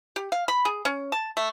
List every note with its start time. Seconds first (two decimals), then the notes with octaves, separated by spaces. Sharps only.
0.16 G4
0.32 F5
0.48 B5
0.65 G#4
0.85 C#4
1.12 A5
1.37 A3